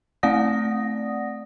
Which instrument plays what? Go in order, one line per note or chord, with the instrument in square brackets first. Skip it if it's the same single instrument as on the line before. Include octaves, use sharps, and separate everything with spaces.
[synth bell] A3 C4 D5 F#5 D#6 A#6